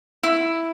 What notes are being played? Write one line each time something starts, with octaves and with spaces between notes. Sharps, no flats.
E4